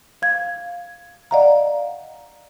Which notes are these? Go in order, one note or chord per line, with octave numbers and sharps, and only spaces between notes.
F5 G#6
D5 D#5 F5 F#5 A#5